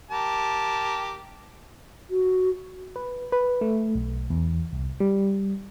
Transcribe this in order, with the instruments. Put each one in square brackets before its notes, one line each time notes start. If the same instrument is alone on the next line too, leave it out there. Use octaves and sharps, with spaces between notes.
[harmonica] G4 A#4 A5
[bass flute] F#4
[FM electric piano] B4
B4
A3
B1
E2
C2
G3